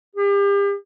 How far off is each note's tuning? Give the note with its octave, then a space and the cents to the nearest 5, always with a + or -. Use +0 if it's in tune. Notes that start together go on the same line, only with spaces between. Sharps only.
G4 +40